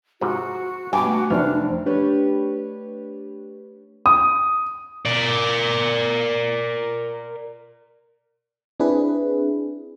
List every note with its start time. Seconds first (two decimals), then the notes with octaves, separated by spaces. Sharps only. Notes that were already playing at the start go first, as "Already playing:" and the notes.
0.21 G#2 C3 F3 F#4
0.93 G2 B2 G5 G#5 D6
1.06 A3 F#4
1.30 F1 E3 C4 D4 F6
1.86 A3 D4 G4 B4 C#5
4.06 D#6
5.05 A#4 D5
8.80 C4 D4 E4 G#4 B4